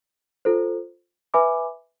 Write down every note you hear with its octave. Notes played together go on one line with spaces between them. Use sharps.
F4 A4 C5
B4 E5 G#5 B5 D6